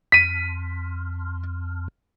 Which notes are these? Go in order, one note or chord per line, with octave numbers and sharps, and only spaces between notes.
F2 B6 D#7